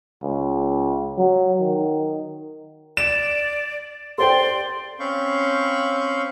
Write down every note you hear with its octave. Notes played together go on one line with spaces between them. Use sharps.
C#2
F#3
D#3
D5 E7
A4 C5 D5 G5 C6
C4 C#4 F5 B5 C#6 G6